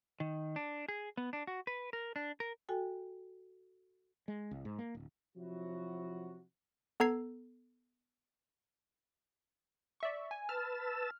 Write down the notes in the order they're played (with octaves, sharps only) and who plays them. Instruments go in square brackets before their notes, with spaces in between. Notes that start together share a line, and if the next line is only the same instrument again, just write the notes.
[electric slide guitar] D#3
D4
G#4
B3
D4
F#4
B4
A#4
D4
A#4
[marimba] F#4 A4 G5 G#5
[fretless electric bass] G#3
C2
G#2
A#3
D1
[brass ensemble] C3 F3 F#3 E4 F#4
[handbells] B3 A4 A#5 E6 G#6 C7
[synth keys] D5 E5 C#6
G#5
[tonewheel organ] B4 A5 E6 [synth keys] F6